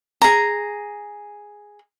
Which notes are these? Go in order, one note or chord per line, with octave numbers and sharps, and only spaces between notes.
G#4 A#5